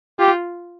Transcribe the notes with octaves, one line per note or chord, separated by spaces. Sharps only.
F4 G4